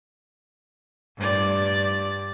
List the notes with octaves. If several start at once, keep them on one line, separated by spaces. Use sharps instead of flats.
G2 D5